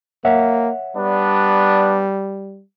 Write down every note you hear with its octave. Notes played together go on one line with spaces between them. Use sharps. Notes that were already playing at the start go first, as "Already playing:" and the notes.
A#3 C#5 E5 F#5
G3 B3 D4